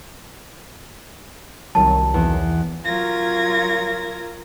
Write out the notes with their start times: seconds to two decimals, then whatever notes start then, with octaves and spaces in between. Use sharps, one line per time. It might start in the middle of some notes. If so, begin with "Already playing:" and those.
1.75 C2 D#3 F#3 A5
2.14 E2
2.84 F#3 F4 A#4 G#6 A#6